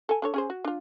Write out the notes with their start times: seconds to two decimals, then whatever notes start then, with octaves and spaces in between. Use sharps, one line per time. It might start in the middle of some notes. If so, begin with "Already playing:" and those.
0.09 A4 G#5
0.22 D4 A4 C#5
0.34 C#4 G#4 C5
0.50 F#4
0.64 D4 F4